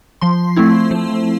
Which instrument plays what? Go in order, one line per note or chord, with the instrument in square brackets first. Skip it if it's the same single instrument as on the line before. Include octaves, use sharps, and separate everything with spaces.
[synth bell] F3 C6
A3 C4 E4
F3